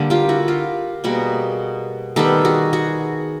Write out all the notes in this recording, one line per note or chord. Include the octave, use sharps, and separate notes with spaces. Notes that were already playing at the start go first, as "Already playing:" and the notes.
Already playing: D3 G3 A#3
F4 G4
E4 F#4
F4 G4
B2 G3 A#3 F#4 G#4
D#3 G3 B3 G4 A4
F#4 G#4
F#4 G#4